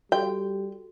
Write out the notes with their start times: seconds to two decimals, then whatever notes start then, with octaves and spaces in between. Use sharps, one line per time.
0.12 G3 F#4 A4 G5